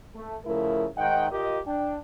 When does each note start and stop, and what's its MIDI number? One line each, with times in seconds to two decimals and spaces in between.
0.15 0.35 57
0.45 0.85 49
0.45 0.85 53
0.45 0.85 57
0.45 0.85 64
0.45 0.85 70
0.97 1.29 44
0.97 1.29 51
0.97 1.29 75
0.97 1.29 78
0.97 1.29 79
1.30 1.59 65
1.30 1.59 67
1.30 1.59 70
1.30 1.59 75
1.66 1.96 62
1.66 1.96 79